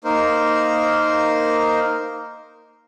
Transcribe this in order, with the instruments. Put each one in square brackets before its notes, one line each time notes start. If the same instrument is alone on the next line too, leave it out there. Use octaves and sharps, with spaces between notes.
[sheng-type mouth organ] A#3 D#4 A#4 C5